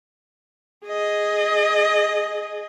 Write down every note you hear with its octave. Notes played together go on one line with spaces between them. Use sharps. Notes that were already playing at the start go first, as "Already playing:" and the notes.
G#4 D#5